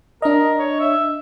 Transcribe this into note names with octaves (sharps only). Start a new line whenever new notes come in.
D4 A#4 D#5
C#5
E5